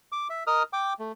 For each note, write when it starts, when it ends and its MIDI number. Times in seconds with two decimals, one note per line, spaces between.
0.12 0.28 86
0.30 0.44 76
0.47 0.63 70
0.47 0.63 75
0.47 0.63 87
0.47 0.63 89
0.73 0.93 79
0.73 0.93 86
0.99 1.12 57